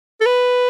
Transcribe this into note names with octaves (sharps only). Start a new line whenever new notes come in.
A4
B4